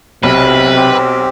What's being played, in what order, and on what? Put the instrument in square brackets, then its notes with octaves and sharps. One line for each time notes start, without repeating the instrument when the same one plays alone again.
[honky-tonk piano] B1 [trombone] C3 [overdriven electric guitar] B4
[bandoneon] C4 G4